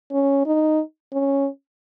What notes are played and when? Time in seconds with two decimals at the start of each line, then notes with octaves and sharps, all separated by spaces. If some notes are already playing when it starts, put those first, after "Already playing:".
0.12 C#4
0.46 D#4
1.13 C#4